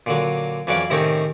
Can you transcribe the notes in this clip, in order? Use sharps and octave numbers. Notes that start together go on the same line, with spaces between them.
A#2 D3 F#3
F2 E3 F#3 C#4 D5 F5
A2 C3 D#3 C4 C#4 D#4